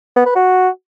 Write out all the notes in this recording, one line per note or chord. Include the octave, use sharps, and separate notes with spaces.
B3
B4
F#4